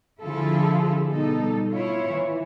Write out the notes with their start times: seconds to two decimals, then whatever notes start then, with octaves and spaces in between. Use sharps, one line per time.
0.22 D3 F3 E4 F4 G#4 A4
1.11 B2 G3 D#4 A4
1.74 E4 F4 C#5
2.07 E3